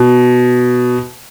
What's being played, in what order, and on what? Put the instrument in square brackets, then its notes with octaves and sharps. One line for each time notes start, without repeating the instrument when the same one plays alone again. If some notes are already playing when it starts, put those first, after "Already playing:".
Already playing: [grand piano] B2